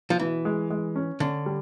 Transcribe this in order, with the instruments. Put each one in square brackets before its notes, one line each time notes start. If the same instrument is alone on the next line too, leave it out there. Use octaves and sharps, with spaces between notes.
[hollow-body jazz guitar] F3
[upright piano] B2 [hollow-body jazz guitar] E3
[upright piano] G#3
G#3
C#4
[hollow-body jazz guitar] D3 [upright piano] C#4
[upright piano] G3